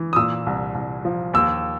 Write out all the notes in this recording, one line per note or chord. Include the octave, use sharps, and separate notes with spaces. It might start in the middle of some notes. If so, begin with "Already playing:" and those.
Already playing: E3
D#6
A#2 E6
C2
C2
F3
D#2 E6